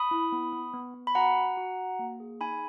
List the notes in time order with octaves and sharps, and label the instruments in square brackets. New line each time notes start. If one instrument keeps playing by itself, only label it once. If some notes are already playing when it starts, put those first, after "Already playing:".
Already playing: [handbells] B5 D#6
E4
B3
B3
B3
B3
B5
F#4 F#5 A#5
F#4
F#4
F#4
A#3
G#4
D#4 G#5 B5